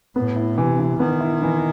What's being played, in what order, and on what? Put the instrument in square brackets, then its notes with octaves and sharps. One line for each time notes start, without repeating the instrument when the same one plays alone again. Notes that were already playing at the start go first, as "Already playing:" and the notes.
[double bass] A2 [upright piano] B3
[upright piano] E4
[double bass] C3 [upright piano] E3
[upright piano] E3
[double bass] D#3 [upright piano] B3
[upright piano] E4
E3